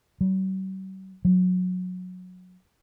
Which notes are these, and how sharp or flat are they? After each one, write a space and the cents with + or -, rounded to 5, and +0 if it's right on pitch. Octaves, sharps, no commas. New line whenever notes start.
F#3 +45
F#3 -20